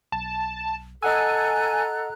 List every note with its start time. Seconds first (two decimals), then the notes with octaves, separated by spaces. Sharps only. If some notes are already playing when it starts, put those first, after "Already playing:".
0.12 B1 A5
1.02 A4 D#5 F#5 G#5 A#5 E6 F#6